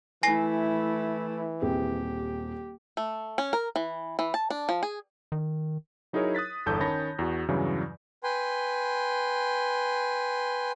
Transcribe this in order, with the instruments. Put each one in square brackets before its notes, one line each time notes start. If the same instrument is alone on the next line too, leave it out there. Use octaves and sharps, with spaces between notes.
[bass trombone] E3 [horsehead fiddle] A3 E4 [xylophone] G#5 A#6 C7
[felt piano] D#1 C4 G#4 [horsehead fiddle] G4
[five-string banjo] A3
C#4
A#4
E3
E3
A5
D4
F3
G#4
[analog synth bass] D#3
[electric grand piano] F#3 D#4 E4 G#4 A#4 C#5
D#6 F#6 A6 B6
G1 E2 A4 A5 G6
D#3 C#4 C#5 A5 B5 A#6
E2 F#4
E2 G2 C#3 E3 F#3
[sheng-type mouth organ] B4 G5 G#5 C6